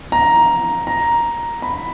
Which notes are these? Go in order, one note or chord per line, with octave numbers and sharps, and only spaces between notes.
A#5
A#5
B5